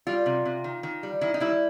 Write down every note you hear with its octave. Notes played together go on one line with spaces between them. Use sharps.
G3 F4
C3
C3
D#3
D#3
G3
D#3 E4
D#4
G3 E4